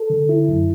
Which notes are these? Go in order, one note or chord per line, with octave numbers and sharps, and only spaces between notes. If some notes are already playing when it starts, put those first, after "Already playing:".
Already playing: A4
D3
E4
F#2